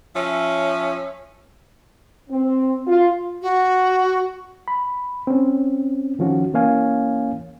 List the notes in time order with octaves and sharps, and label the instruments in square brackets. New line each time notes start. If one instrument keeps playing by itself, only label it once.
[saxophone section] F3 C#4 E5
[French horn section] C4
F4
[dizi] F#4
[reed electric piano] B5
C4 C#4
D#3 F3 C#4 F#4
E3 A#3 C#4 C#5 F5 G#5